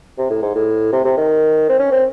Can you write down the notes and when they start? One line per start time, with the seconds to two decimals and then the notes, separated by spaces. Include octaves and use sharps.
0.18 C3
0.30 A2
0.42 G#2
0.55 A2
0.92 C3
1.05 C3
1.17 D#3
1.69 C4
1.79 C#4
1.91 C4